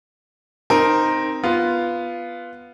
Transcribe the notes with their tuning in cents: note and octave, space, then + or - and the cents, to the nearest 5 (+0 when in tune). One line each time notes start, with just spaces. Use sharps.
C4 +0 D#4 -5 A#4 +0
B3 +0 F4 -10